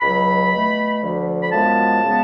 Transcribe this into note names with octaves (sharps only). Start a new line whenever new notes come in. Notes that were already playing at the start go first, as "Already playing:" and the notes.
C#2 B2 F#3 B5
B2 A3
D2 D3 F3
B5
F#2 F3 G#3 B3 A5
C#3 G#3 B3